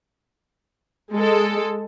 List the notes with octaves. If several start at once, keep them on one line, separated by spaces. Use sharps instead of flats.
G#3 A4